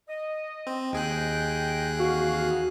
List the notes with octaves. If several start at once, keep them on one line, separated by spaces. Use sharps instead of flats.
D#5
C4
D#2 G#4 D#5 G5 F#6
F2 E3 F#4 F5